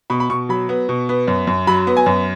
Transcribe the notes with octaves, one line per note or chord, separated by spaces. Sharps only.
B2 B5
B5
B2 C#6
F#3 B5
B3
B2
B3
F#2
F#2
F#3 B5
B3
G#5
F#2